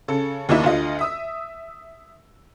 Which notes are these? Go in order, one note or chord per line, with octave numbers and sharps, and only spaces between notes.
C#3 A4
D#2 A#3 D#4 E4
D2 D3 F4 D#5
E5 D#6 E6